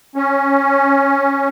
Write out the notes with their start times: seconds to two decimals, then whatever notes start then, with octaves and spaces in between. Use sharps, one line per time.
0.16 C#4